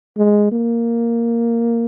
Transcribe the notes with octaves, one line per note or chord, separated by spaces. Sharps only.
G#3
A#3